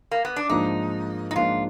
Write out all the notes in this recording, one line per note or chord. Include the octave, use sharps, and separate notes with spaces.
A#3
B3
D4
G#2 F3 A#3 D4 D#4
D#4
G#2 F3 A#3 D4 F4